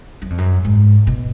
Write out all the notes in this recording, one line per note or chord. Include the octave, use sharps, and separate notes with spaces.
F#2
F2
F#2
G#2
B2